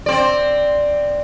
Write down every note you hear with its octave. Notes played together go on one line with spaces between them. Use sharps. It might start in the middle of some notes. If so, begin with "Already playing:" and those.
C4 D5